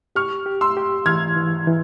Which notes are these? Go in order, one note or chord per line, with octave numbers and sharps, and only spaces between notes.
G4 C#6 F6
G4
C6 E6
G4
E3 F6 G#6
E3
E3